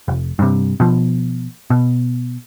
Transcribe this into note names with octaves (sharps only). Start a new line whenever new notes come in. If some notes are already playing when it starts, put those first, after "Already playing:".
F1
G2 C3
B2 F3
B2